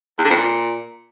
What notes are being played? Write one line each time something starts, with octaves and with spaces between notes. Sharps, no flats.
E2
D3
F2
A#2